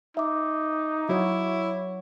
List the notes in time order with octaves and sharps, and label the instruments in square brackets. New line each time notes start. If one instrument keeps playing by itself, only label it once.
[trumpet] D#4 [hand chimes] E5 D6
[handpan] F#3 F#4 C#5 [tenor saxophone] E4